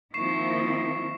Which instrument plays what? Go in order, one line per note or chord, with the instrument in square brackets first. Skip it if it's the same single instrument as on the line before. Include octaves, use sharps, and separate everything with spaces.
[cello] D#3 F3 [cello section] A#3 C4 E4 [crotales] C#6 C7 E7